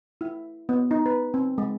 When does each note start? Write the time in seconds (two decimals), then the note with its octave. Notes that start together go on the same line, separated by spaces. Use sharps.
0.21 E4
0.69 B3
0.91 D#4
1.06 B4
1.34 C4
1.58 G#3